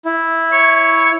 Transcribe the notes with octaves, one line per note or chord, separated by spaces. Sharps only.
E4
C#5